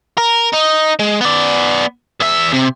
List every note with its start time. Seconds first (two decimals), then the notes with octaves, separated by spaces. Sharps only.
0.18 A#4
0.53 D#4
0.99 G#3
1.21 B3 D5
2.20 E2 E5
2.53 C3